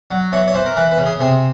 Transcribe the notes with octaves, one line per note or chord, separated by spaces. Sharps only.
F#3
E3 C#5
C#5
E3 C5
A#4
E3 B4
B4
C#3
G#4
C3 G#4